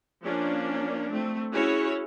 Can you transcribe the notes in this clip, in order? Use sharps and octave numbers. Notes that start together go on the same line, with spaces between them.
F3 A#3 C#4 D4
A3 C4
C#4 E4 F#4 G#4 C#5